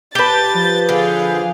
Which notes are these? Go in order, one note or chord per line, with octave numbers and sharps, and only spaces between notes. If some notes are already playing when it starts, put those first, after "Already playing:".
G4 B4 A5 G6 A6
F3
D3 G#4 F5